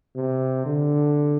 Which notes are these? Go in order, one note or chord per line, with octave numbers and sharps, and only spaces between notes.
C3
D3